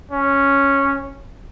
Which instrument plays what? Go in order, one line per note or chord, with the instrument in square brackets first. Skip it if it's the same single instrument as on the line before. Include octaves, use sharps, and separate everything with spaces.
[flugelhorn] C#4